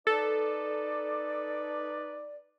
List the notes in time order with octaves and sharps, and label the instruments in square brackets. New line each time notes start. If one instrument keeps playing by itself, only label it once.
[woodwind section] D#4 B4 D5 [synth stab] A4